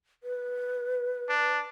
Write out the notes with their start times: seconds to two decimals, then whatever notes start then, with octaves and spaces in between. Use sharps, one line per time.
0.23 B4
1.29 D4